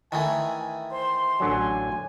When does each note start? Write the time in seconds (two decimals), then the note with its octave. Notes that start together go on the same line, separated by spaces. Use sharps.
0.12 D#3 E3 A3 G#5
0.92 C5 C6
1.40 A1 D3 F#3 G#5